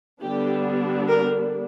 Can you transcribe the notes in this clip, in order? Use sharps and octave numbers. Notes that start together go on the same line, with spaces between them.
D3 G3 B3 D4 G4
A#4